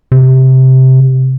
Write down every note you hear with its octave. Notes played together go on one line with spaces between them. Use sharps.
C3